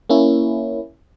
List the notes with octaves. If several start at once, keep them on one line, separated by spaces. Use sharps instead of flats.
A#3 C#4 E4